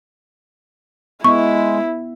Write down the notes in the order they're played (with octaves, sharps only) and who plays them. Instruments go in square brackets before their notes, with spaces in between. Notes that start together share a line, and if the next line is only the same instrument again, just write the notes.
[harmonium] G#3 [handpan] B3 [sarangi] E4 [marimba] C#6